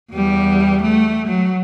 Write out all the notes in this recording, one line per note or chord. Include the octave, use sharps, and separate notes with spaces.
E2 G3
A3
F#3